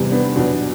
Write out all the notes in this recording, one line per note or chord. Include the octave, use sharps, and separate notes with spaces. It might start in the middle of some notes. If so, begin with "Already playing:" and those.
Already playing: E2 C3 G3
B3 D4
E2 B2 F#3 D4 F#4